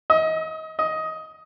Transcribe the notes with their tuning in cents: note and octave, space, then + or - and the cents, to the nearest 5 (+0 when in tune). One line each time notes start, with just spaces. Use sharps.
D#5 +30
D#5 +15